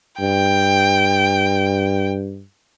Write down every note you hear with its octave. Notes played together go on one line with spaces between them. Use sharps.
G2 G5